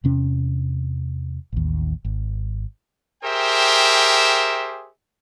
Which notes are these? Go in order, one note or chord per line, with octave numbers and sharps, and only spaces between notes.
E2 C3 C#4
A1 D#2
G#1
G4 G#4 A#4 C5 E5 G5